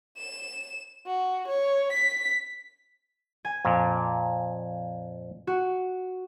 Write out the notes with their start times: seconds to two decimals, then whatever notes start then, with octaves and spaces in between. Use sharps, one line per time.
0.17 E7
1.06 F#4
1.48 C#5
1.92 B6
3.45 G#5
3.65 F2 A#2
5.47 F#4